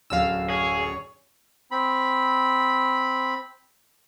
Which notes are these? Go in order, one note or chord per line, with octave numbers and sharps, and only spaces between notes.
D1 F#2 D3 F5 E6
G#4 C#5
C4 B5